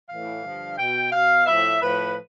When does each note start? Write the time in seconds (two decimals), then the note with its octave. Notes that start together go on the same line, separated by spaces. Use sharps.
0.09 A2 E3 F5
0.44 G2 D3 F3
0.78 B2 G5
1.12 B2 F5
1.46 A2 F3 E5
1.81 A2 F3 B4